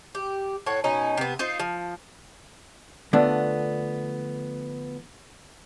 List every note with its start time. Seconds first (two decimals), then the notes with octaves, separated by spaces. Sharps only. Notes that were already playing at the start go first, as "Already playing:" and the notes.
0.15 G4
0.66 A2 C#5 F#5
0.84 B2 C#4 D#4
1.17 C3 B3
1.39 D#4 F4 C5
1.59 F3
3.13 D3 F3 A3 B3 D4